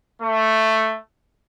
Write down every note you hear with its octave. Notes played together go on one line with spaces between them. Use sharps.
A3